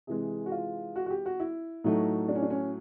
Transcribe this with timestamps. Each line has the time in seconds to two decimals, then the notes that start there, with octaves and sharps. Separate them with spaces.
0.07 C3 E3 G#3 G#4
0.46 F#4
0.52 F4
0.96 F#4
1.06 F#4
1.10 G4
1.26 F#4
1.40 E4
1.84 A2 F#3 A3 D#4
2.28 D4
2.35 C#4
2.42 D4
2.50 C#4